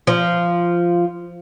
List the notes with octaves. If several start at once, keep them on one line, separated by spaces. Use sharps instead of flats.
F3